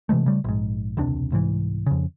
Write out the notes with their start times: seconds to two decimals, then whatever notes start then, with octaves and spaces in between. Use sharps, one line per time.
0.09 C3 E3 G#3 A3
0.26 C#3 G3 A3
0.44 A#1 G#2
0.97 E1 C#2 C3 D4
1.32 C2 G#2 E3
1.86 F2 C#3